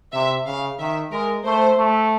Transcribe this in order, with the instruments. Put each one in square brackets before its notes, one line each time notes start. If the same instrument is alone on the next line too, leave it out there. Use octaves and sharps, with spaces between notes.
[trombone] C3 [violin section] E5
[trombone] C#3 [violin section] F5
[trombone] D#3 [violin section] E5
[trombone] G#3 [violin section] A#4
[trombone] A3 [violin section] C5
[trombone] A3